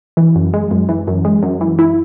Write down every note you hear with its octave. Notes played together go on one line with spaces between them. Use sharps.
E3
F#2
G#3
F#2
E3
F#2
G#3
F#2
E3
E4